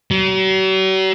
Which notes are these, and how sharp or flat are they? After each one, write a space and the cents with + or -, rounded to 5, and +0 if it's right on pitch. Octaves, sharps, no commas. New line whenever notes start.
F#3 +45